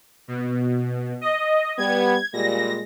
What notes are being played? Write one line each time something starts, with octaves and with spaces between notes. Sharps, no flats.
B2
D#5
G3 B3 G#6
A#2 G3 G#3 A#6